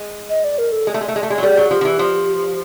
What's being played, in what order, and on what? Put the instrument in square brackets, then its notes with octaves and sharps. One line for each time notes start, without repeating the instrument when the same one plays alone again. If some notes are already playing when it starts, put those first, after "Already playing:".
Already playing: [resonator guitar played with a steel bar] G#3
[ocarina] D#5
D5
A#4
A4
[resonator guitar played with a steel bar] G#3
A3
G#3
A3
G#3
A3
G#3
F#3
[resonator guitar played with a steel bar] G3 [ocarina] G#4 A4
[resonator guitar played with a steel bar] F#3
[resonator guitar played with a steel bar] F3 [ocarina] G4
[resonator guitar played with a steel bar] F3
E3
F3